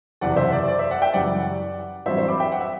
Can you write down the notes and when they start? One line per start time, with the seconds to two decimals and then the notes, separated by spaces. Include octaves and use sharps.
0.21 F#1 E2 C3 D5 F#5
0.36 C5 E5
0.52 D5
0.68 D5
0.79 C5 E5
0.91 D5 F#5
1.02 E5 G5
1.13 F#1 F#2 E3 G3 D5 F#5
2.06 A1 G2 F#3 C4 E4 C5 E5
2.17 C5 E5
2.28 B5 D6
2.40 E5 G5
2.52 F#5
2.61 E5